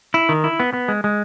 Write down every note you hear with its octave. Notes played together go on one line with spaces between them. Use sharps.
E4
D#3
E4
B3
B3
G#3
G#3